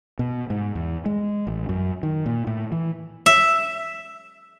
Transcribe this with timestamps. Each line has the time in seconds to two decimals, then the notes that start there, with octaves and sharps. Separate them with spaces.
0.19 B2
0.50 G#2
0.75 E2
1.06 G#3
1.47 A1
1.69 F#2
2.03 D#3
2.26 A#2
2.47 A2
2.72 E3
3.26 E5